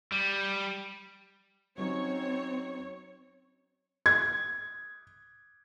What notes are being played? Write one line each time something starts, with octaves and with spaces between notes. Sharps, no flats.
G3
F#3 C4 C#4 D#4 C#5
G#6